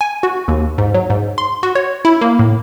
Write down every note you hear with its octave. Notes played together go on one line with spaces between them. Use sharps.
G#5
F#4
D#2
G#2
F#3
G#2
C6
F#4
C#5
E4
A#3
A2